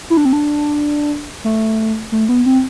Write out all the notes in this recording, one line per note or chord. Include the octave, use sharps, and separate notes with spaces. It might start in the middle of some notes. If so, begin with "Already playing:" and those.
E4
D4
C4
D4
A3
A3
B3
C4